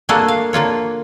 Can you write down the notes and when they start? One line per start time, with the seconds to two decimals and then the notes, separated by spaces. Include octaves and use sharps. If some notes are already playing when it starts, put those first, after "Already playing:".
0.09 A3 A#3 D4 F#4 G#4 A4
0.28 F5
0.53 D3 A#3 F4 C#5